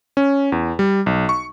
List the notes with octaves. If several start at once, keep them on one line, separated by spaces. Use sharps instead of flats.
C#4
E2
G3
B1
C#6